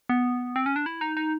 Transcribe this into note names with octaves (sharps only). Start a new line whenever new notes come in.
B3
C4
C#4
D4
E4
D#4
D#4